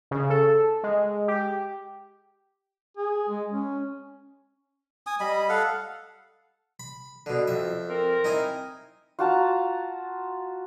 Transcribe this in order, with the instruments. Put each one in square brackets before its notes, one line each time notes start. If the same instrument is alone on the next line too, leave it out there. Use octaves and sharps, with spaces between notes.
[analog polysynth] C#3
A4
G#3
G4
[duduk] G#4
G#3
C#4
[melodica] G#5 D#6
G3 D#5 B5
A4 F5 F#5
[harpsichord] B5
B2 D3
F2 E5
[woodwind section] C4 A#4
[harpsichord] D#4 E4 G#5
[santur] F4 F#4 A5 A#5